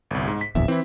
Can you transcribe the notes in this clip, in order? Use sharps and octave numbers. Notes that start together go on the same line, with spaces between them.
G1 C2
G#2
B6
D1 A#1 E2 E5
E3 C4 E4